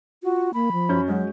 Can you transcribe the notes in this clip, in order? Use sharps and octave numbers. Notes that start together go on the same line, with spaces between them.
F4 F#4
A#3 B5
F3
F#2 C#4 G6
F#3 G#3 C#4 F#4